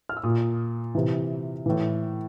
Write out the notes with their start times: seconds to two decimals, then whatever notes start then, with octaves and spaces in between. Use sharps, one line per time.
0.09 F6
0.17 E6
0.23 A#2 D#6
0.95 C3 E3
1.66 A2 E3